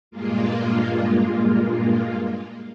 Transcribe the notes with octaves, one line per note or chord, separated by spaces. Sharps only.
G2 A#2 G#3 A#3 F4